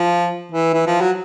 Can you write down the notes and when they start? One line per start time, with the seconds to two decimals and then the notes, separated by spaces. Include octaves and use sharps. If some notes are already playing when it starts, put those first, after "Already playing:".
Already playing: F3
0.52 E3
0.74 E3
0.86 F3
1.01 F#3